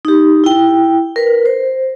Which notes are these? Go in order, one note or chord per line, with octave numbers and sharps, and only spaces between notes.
D#4 G4
E4 G5
A#4 B4
C5